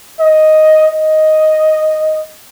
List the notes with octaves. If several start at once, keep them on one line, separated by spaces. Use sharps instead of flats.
D#5
D#5